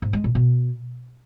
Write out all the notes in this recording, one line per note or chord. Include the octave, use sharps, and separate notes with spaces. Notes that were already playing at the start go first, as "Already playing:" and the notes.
G#2
G#3
A#2
B2